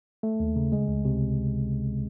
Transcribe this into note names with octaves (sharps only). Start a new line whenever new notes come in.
A3
D#2
C#3
G#3
C#2
C3